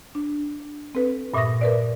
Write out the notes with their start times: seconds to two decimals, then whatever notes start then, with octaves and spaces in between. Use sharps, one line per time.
0.15 D4
0.95 C4 A4 B4
1.34 G2 A#2 E5 C#6 D#6 A#6
1.61 A#4 B4 D5